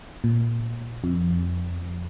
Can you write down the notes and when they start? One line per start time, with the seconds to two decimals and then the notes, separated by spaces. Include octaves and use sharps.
0.24 A#2
1.04 F2